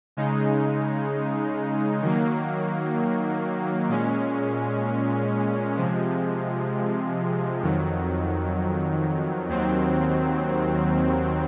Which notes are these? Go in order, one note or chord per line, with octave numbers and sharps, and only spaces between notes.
C#3 G#3 D#4
D#3 F#3 A#3
A#2 G#3 C#4
C3 F3 G#3
F2 D#3 F#3
D#2 D#3 F#3 C4